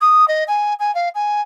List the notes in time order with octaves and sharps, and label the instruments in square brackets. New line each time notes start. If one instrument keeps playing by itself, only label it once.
[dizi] D#6
D#5
G#5
G#5
F5
G#5